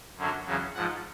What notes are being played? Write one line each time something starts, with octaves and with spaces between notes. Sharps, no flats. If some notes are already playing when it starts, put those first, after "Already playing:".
F#2 D3 F#3
E2 C#3 F#3
G#2 F3 F#5